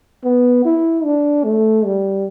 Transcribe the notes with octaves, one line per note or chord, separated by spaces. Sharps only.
B3
E4
D4
A3
G3